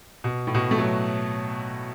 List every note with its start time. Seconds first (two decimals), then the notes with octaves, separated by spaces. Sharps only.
0.24 B2
0.47 A2
0.54 B2
0.71 A3
0.78 F#3